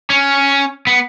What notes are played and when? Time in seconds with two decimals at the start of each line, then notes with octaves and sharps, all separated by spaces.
0.10 C#4
0.87 B3